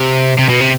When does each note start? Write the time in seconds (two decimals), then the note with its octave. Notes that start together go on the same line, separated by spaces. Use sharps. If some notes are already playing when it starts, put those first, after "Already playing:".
Already playing: C3
0.39 C3
0.49 B2
0.61 C3